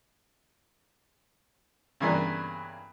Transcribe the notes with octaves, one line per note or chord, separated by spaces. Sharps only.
G2 C#3 E3 A#3 B3 D4